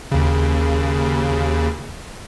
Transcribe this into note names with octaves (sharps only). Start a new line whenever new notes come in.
D#2 C#3